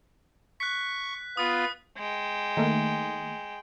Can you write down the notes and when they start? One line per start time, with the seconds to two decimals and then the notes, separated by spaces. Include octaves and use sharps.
0.60 C#6 F#6 B6
1.37 B3 F4 D#6
1.97 G#3 G5
2.57 D#3 A3 A#3